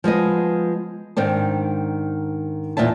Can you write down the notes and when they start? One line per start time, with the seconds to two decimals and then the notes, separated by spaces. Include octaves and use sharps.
0.04 F3 G#3 B3 D#5
1.17 G#2 D#3 C4 D4
2.77 E2 A#2 D5 E5 A5